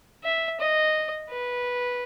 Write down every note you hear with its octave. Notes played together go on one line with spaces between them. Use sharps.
E5
D#5
B4